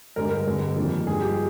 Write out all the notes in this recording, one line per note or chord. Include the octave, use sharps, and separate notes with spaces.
G2 D3 G#3 D4 A#4
A#4
G2 D3 G#3 C4
F2 D#3 A#3 D4
G2 F3 G#3 G#4
G4